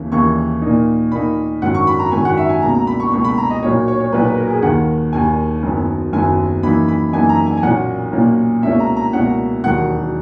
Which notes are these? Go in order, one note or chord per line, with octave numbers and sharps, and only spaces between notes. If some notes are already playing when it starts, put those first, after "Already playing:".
Already playing: D#2 C#3 E3 A#3
D#2 C#3 E3 A#3 C#6
A#2 A#3 D#4
A#2 A#3 D#4 B5
G#1 F#2 D#3 F#3 F#5
C#6
B5
A#5
G#1 F#2 D#3 F#3 G#5
F#5
E5
G#5
C#2 B2 A#3 A#5
A#5
B5
C#6
C#2 B2 A#3 C#6
B5
A#5
D#5
B1 A#2 F#3 C#5
C#5
C#5
B1 A#2 F#3 B4
B4
A#4
G#4
D#2 D#3 A#3 F#5
D#2 D#3 A#3 G#5
F#1 F#2 D#3 F#3 B3
F#1 F#2 D#3 F#3 B3 G#5
F#2 E3 A#3 D#4 B5
B5
F#2 E3 A#3 D#4 G#5
A#5
G#5
G#5
B1 A#2 A#3 C#4 F#5
B1 A#2 A#3 C#4
C#2 B2 A#3 C#4 E4 E5
A#5
A#5
C#2 B2 A#3 C#4 E4 F#5
E1 D#2 D#3 F#3 F#5